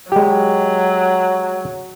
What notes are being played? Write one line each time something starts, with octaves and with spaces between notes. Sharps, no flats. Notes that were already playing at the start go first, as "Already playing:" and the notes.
F#3 G#3 G4